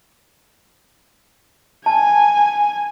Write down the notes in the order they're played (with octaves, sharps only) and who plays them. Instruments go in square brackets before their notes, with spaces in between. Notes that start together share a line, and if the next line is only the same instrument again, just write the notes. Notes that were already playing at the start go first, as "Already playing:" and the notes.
[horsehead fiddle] G#5 [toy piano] A5